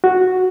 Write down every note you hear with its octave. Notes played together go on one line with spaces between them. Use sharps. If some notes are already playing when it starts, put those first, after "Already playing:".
F#4